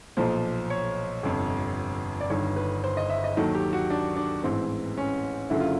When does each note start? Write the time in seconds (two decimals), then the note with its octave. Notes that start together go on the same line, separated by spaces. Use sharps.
0.17 B1 A#2 F3 C5
0.70 C#5
1.23 G1 F2 C3
2.21 D5
2.30 G1 G2 D#3 C#5
2.56 B4
2.84 C5
2.97 D#5
3.10 E5
3.24 D#5
3.37 D#2 D#3 F#3 A4
3.55 G4
3.73 F#4
3.90 D4
4.16 D4
4.43 A1 G#2 E3 C4
4.98 C#4
5.50 F#1 F#2 D3 F#3 E4
5.60 F4